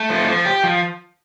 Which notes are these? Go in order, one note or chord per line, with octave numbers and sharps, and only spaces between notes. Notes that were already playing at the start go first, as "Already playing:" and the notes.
Already playing: A3
F3
F3
G4
F3